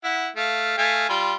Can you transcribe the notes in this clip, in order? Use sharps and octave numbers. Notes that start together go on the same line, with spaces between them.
E4 F#5
A3 F5
A3 F5 G#5
G3 F4